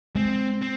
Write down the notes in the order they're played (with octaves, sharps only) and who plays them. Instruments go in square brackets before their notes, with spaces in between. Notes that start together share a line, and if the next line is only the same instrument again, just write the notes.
[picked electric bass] G#3 [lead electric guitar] C4
[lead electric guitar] C4